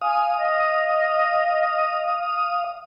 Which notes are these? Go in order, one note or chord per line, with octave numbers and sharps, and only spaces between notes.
F5 G#5 D#6
D#5